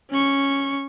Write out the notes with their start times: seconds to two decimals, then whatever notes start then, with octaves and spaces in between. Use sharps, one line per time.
0.11 C#4 C#6